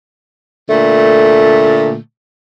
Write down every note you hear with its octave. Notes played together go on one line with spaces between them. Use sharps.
A#2 D3 A3